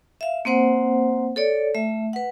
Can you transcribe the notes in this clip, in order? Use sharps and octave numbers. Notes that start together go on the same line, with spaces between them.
E5 F5
A#3 C4 C5 F#5
A4 C#5 D5
A3 E5
B4 F#5